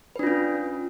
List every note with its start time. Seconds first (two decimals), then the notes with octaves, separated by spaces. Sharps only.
0.16 B4
0.19 D4
0.23 F4
0.27 C#4